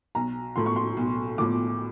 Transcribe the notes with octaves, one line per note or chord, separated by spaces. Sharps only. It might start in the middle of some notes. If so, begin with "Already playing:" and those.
B1 A#5
A2 F3 C6
C#6
C6
B1
A2 F3 D6